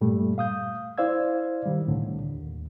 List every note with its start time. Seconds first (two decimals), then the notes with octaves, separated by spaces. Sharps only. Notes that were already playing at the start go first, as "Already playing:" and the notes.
0.01 G2 A#2 G3 A3
0.38 F5 D#6 G6
0.98 E4 C5 D5 F5 E6 G#6
1.65 D#3 G3
1.88 C2 A2 D3
2.30 D#2